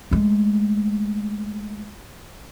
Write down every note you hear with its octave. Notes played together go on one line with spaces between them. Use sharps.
G#3 A3